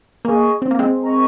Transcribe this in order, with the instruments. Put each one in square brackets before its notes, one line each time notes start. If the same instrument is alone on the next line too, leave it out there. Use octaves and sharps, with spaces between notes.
[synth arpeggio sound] A#3 [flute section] G#4 D#5 G#5 C#6
[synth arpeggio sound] C4
A#3
G#3 C4
[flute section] A#4 D#5 A#5 C#6